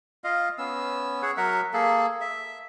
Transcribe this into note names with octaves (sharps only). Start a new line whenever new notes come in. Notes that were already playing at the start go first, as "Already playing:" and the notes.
F4 D#5 F5
B3 C#4 E6
G#4 C#5 F#5
F#3 A#4 E5 F#5
A#3 G#4 A4
E5